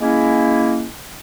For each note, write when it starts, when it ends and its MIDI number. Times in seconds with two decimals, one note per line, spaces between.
0.01 0.87 56
0.01 0.87 58
0.01 0.87 61
0.01 0.87 64